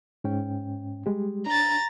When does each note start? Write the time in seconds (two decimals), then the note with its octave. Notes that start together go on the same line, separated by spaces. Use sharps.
0.24 G#2 C#4 G5
1.06 G3 G#3 G4
1.46 D4 A#5 A6